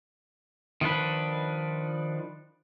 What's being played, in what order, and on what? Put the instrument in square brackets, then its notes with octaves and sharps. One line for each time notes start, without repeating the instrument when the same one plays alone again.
[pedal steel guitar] D#3 F3 D4 B4